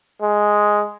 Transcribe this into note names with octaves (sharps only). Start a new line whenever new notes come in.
G#3